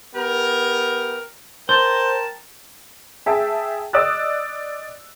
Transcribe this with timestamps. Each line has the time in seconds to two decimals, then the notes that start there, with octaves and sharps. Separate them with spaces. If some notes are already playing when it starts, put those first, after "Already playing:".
0.15 B3 G4 A#4
1.69 A#4 C5 G5 A5
3.26 G#4 E5 G5 A5
3.93 D5 D#5 D#6 E6 F#6 A6